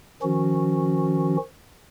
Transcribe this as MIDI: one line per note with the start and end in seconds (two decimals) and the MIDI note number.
0.23 1.37 51
0.23 1.37 53
0.23 1.37 61
0.23 1.37 66